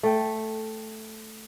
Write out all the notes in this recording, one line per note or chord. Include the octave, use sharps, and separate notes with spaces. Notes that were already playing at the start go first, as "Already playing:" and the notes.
A3 G5